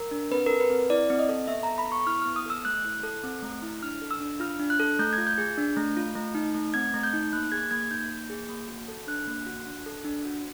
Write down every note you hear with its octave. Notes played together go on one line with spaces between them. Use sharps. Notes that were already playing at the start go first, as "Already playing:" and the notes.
Already playing: A#4
D4
C4 B4
A4 A#4
B4
C4
E4 D5
C4
D#5
A4
B3 E5
A#5
A4
B5
B3 C#6
E4 F6
B3 F6
D#6
A4 E6
A3 F#6
E4
A4
C4
A3
E4
D4 F6
A4
E6
D4
F4 F6
D4
F#6
A4
A3 G6
G#6
F4
G6
G#4
D4
A3
F4
A3
D#4
A3
C4 G#6
A3
G6
D#4
A#3 F#6
G#4 G#6
A#3 G#6
D#4 G6
A#3
G#4
A#3
F#4
A4
D4 F#6
A#3
F#4
D4
A4
D4
F#4